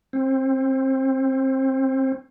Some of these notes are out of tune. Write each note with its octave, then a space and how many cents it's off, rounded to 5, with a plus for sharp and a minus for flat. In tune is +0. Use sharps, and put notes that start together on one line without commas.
C4 +25